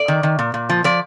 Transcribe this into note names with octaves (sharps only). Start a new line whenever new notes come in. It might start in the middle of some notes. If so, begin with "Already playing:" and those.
Already playing: D5
D#3
D#3
A#2
A#2
F3
F3 D5